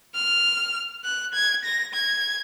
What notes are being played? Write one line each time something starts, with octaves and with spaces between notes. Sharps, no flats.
F6
F#6
G#6
A#6
G#6